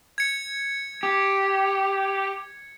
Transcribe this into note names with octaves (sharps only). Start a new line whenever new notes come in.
G#6 C#7
G4